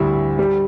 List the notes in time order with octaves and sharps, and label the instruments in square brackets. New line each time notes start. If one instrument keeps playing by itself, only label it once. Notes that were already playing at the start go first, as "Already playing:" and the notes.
Already playing: [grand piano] D2 G3 E4
G3